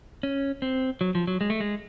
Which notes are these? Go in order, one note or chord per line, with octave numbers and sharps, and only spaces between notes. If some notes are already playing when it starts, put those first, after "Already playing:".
C#4
C4
F#3
F3
F#3
G#3
A3
G#3